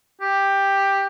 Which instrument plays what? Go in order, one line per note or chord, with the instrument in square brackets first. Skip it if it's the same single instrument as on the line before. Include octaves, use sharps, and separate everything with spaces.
[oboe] G4